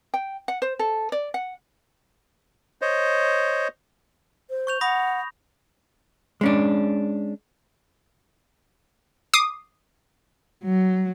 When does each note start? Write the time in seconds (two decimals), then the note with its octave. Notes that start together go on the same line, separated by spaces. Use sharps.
0.14 G5
0.48 F#5
0.62 C5
0.79 A4
1.12 D5
1.34 F#5
2.81 C5 C#5 D#5
4.50 C5
4.67 C#6 G6 F7
4.81 F#5 B5 D#6 A#6
6.41 G#3 C#4 D4
9.33 D6 D#6 C7
10.64 F#3